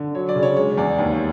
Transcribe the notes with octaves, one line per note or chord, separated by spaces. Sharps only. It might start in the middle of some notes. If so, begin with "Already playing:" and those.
Already playing: D3
F#3 C#5
D5
C#3
C#5
G#3 C#5
E2 D5
D#2